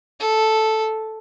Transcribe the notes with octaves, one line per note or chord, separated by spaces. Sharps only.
A4